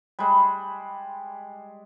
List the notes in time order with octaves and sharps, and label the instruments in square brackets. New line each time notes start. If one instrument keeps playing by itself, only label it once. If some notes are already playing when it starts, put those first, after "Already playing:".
[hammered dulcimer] G3 G#3